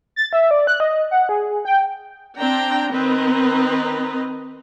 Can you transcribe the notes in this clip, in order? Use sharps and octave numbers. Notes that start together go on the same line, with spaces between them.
A6
E5
D5
F#6
D#5
F#5
G#4
G5
C4 D4 G5 A#5
D#3 C4 B4 D#5 A#5